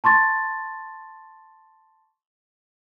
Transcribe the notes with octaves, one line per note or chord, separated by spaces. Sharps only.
A5 C6 C#6 A6